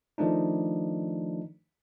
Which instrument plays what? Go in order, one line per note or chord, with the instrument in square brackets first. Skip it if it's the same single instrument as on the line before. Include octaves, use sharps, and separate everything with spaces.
[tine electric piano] D#3 F3 A3 D4 D#4